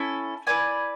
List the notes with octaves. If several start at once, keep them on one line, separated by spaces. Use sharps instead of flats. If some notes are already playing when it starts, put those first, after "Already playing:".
Already playing: C#4 E4 A4
E4 B4 D5 G#5